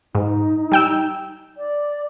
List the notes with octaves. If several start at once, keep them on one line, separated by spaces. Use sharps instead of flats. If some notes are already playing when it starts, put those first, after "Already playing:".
G#2 D#4
G3 G5 E6
D5